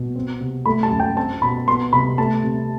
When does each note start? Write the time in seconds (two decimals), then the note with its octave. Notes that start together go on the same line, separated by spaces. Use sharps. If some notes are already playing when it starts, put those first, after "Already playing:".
Already playing: B2
0.16 C4
0.40 C3
0.66 A3 B5
0.83 A5
0.91 F#2
1.00 G5
1.17 C4 A5
1.42 B2 B5
1.68 B3 C6
1.93 C3 B5
2.18 A3 A5
2.44 C3